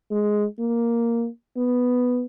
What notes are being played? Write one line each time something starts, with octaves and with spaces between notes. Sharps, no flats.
G#3
A#3
B3